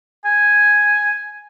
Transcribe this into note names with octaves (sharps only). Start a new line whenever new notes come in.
G#5